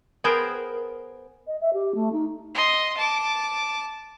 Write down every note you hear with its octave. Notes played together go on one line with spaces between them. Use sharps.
B3 G#4 A#4 C5 G5
D#5
E5
G4
A3
D#4
D#5 C6
A5 D6